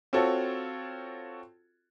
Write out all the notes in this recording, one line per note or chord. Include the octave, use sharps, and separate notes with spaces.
C4 F4 F#4 A4 C#5